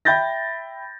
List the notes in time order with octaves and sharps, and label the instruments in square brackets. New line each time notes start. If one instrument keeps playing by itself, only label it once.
[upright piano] E5 G5 B5 G6 A6 A#6